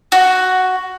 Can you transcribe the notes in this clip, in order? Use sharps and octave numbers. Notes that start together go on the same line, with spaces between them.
F#4